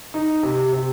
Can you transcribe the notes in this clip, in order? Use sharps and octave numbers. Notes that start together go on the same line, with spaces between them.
D#4
C3
C3